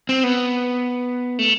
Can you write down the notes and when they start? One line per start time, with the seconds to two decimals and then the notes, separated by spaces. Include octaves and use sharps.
0.09 C4
0.24 B3
1.39 A3